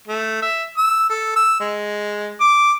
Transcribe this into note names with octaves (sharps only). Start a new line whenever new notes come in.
A3
E5
E6
A4
E6
G#3
D6